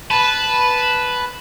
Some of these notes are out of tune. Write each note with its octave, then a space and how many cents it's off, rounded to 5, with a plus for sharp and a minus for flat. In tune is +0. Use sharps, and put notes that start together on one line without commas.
B4 +0 A5 -15